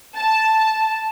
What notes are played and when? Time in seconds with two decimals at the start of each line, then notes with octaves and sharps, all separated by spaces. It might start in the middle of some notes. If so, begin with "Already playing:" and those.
0.17 A5